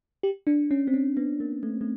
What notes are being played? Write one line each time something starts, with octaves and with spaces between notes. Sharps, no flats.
G4
D4
C#4
C4
C#4
B3
A#3
A3
A3